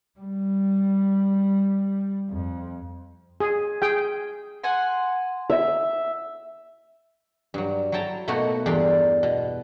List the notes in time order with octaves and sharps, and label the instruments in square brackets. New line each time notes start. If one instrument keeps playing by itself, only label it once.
[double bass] G3
F2
[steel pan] G#4
G#4 G5
[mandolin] F#5 G#5 C6
[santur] E5
[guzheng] G2 F#3
F#3 E4 G5 A5 A#5
B2 A3 A#3 D#4 F#4
E2 G2 D4 G4 A#4 C6
B2